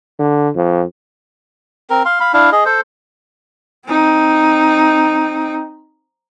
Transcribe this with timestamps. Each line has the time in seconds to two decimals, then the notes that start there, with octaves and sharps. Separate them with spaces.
0.20 D3
0.55 F2
1.90 C4 A#4
2.05 F5 C6
2.20 F5 B5
2.33 D4 E4 F5
2.52 G#4 D#5
2.65 A4 C5
3.87 C4 D#4